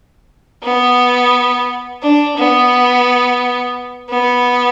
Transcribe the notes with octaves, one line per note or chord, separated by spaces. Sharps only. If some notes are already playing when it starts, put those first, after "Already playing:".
B3
D4
B3
B3